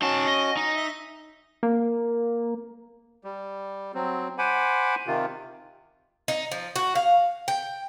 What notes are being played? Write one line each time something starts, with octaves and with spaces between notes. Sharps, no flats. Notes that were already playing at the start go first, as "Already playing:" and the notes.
C#4 D#4 F#4 A5
D#5
D#4
E5
A#3
G3
F#3 C4
C5 F#5 G#5 B5 D6
C3 D#3 F4
D#4
F3
F#4
F5
G5